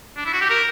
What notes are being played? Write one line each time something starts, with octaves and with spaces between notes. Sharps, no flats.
D4
E4
F#4
G4
A#4